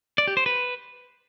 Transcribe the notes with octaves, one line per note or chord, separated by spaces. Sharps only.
D5
G4
C5
B4